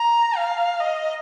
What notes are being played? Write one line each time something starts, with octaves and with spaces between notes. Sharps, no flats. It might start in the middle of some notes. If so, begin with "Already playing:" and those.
Already playing: A#5
F5
D#5